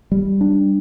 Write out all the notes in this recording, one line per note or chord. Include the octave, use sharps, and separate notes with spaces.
G3
D4